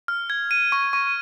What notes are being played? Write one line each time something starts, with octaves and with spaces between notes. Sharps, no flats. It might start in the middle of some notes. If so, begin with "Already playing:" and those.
F6
G#6
D#7
C#6
C#6